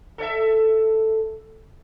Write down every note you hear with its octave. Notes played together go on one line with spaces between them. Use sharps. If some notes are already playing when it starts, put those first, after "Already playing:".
A4 C#5 E5